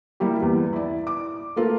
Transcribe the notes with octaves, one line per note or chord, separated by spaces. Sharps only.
G3 A#3 E4 G4
E2
E4 D5
D6
A3 A#3 F4 A4 A#4